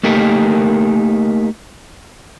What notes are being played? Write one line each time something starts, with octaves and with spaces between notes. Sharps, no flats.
A3 A#3 D#4 G4 A#4